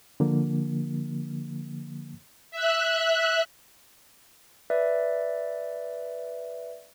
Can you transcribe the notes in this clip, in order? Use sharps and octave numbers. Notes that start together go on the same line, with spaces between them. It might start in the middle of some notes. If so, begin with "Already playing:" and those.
D3 F3 A#3
E5 F#6
B4 D5 E5